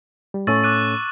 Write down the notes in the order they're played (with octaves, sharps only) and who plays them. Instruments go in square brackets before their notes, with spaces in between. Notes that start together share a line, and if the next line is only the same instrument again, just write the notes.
[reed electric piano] G3
[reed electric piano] A2 A3 C#4 [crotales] C#6 E6 A6
[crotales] D6 F#6 D#7